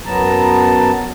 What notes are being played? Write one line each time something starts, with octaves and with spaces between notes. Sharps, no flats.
F#2 F#3 B3 A5 A#5